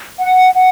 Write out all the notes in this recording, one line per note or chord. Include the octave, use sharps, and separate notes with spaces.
F#5
F#5